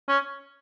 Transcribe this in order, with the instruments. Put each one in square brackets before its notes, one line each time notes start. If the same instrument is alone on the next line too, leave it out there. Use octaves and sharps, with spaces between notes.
[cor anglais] C#4